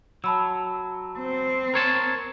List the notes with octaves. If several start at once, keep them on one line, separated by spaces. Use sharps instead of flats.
F#3 A5 B5 E6
C4
A#4 C#5 A5